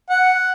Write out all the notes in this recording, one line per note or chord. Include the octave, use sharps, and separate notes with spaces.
F#5